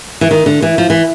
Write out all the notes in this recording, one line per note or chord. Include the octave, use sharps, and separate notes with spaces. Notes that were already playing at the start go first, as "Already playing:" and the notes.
E3
D#3
D3
E3
F3
E3